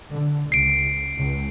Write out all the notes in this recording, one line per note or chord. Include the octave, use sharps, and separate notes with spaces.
D3
C#2 C7 D7
C#2